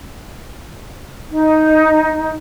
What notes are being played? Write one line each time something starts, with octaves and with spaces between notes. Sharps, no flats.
D#4